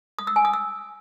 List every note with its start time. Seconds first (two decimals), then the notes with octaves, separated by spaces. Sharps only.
0.19 D#6
0.27 E6
0.36 G#5
0.45 D#6
0.53 E6